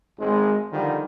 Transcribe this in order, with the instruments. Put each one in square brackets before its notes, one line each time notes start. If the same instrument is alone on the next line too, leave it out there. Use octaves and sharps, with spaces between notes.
[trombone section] G#1 G#3
D3 D#3 F3 G3